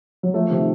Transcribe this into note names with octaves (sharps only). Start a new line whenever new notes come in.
F#3
F3 A3
C3 D#3